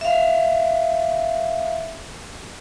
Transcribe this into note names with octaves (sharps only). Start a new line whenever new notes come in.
E5 F5